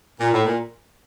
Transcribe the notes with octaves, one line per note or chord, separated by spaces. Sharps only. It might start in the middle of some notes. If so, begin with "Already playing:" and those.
A#2
A2
A#2